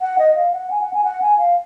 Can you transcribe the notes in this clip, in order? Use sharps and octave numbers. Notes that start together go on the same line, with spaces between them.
F#5
D#5
F5
F#5
G#5
F#5
G#5
F#5
G#5
F5